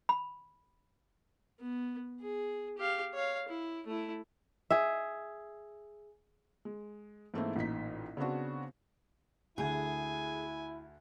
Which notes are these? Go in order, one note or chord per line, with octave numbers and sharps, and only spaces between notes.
B5
B3
G#4
G4 F5
C#5 F5
E4
A3 E4
G#4 E5
G#3
G#2 E3 A3 A#3 C4 E4
A1 A#2 D#4 B6
C#3 B3 C4 D4 F#4
D2 D3 E4 G#4 G#5